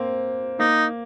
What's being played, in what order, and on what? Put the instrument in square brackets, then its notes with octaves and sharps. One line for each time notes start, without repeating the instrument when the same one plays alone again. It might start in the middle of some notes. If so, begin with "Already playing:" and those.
Already playing: [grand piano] A#3 C4
[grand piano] A#3 [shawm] D#4